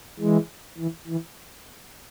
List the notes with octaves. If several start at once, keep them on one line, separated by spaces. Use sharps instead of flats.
E3 G#3
E3
E3